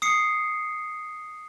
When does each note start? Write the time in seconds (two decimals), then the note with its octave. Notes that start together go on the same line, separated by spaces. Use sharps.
0.02 D#6 C7 C#7